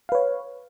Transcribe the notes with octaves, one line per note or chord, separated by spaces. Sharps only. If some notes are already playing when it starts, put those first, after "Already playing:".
B4 C#5 F5